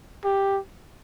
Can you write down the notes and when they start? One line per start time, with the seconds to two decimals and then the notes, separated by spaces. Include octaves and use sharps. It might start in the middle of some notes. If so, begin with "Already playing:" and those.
0.25 G4